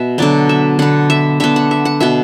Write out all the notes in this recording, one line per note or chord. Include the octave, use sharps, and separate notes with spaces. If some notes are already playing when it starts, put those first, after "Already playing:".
Already playing: B2 E5
D3 F#3 B3 D5
E5
D3 B3 F#5
E5
D3 B3 E5
F#5
E5
F#5
B2 B3 E5